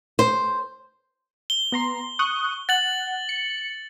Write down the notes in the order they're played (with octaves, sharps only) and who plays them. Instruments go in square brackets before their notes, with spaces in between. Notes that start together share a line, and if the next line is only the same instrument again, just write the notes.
[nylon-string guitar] C5
[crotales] G7
[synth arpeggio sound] B3 A#5 C6
C#6 D#6 F#6
[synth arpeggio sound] F#5 [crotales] A6 F#7
[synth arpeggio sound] C#7